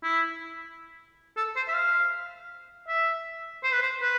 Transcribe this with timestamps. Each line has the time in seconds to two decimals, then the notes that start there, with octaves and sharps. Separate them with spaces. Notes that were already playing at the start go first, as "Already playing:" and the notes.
0.03 E4
1.37 A4
1.56 C5
1.68 E5
1.74 F5
2.88 E5
3.63 C5
3.73 B4
3.82 C5
4.02 B4